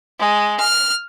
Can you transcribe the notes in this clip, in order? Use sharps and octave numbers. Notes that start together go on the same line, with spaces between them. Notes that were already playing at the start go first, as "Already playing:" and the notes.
G#3
F6